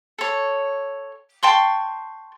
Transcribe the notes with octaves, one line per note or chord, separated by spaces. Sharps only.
A4 C#5
G5 A5 C6 C#6